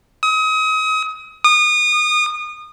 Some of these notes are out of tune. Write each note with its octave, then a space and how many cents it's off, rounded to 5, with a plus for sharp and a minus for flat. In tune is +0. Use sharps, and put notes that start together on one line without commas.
D#6 +35
D#6 -30